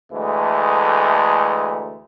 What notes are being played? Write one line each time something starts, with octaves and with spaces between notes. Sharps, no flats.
D2 E3 G#3 A3